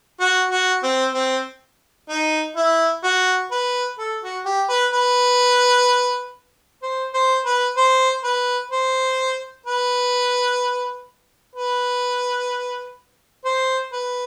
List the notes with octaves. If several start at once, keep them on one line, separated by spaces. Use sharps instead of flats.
F#4
F#4
C4
C4
D#4
E4
F#4
B4
A4
F#4
G4
B4
B4
C5
C5
B4
C5
B4
C5
B4
B4
C5
B4